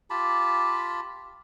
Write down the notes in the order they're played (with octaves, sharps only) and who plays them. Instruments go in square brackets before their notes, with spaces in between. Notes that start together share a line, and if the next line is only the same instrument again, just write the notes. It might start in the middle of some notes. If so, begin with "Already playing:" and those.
[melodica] F4 G4 A5 B5